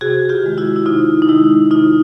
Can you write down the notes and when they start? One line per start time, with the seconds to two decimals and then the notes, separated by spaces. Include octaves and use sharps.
0.01 C3 F#4 G#4
0.29 F4 G4
0.43 D#3 G#3
0.58 E4 F#4
0.76 E4
0.86 C3 D#4 F4
1.22 D#4
1.29 D#3 G#3 E4
1.71 C3 D#4 F4